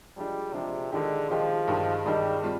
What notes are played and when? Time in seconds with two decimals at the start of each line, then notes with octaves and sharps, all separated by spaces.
0.17 F3 G3 G#3 D4
0.54 C3 F3 G#3 D4
0.92 D3 D#3 G#3 D#4 G4
1.30 D#3 F3 G#3 D#4 G4
1.68 G2 D#3 G#3 D#4 G4
2.05 G2 D#3 G3 G#3 D#4 G4
2.43 G3 C4 F4